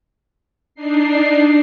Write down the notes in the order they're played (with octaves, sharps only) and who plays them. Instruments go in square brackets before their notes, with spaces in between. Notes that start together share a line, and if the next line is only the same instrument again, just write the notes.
[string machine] D4 D#4 C7